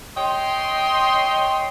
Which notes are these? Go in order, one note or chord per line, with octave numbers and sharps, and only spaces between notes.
C#5 D#5 G5 C6